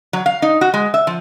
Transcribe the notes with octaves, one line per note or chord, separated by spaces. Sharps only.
F#3
F5
D#4
F#4
G#3
E5
F3